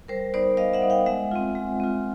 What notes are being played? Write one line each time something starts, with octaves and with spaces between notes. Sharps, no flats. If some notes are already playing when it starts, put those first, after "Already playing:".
G3 A#4 C5
B3 D#4 C5 D5
G3 D#5 F5
E5 F#5
B3 D#4
F5 G5
G#3 E5 F#5
C4 F4
G#3
C4 F4